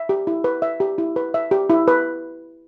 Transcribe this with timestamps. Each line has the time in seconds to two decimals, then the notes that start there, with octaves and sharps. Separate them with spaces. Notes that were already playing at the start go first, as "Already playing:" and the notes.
Already playing: E5
0.09 G4
0.27 E4
0.44 B4
0.62 E5
0.80 G4
0.98 E4
1.16 B4
1.34 E5
1.51 G4
1.70 E4
1.88 B4